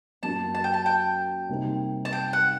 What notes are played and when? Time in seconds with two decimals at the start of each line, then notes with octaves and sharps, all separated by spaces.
0.23 F#2 F#3 A#3 F#4 A5
0.55 A5
0.64 G5
0.74 A5
0.86 G5
1.49 C3 G3 A#3 D#4
2.05 A5
2.13 G5
2.33 F#5